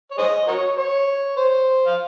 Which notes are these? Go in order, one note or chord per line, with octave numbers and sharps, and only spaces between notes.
C#5
G#4 C5 D#5
F#4 A#4 C#5
C#5
C5
F5